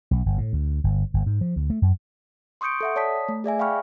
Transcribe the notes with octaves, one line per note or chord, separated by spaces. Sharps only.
B1
G1
A2
D2
G1
G1
G#2
F3
D2
A3
F#2
C6 C#6 D#6 G6 C#7 D7
A4 E5 F#5
C#5 D5 A5 D#6 B6
A3
G#4 D5 E5 G#5
F5 G5 B5 C#6 F6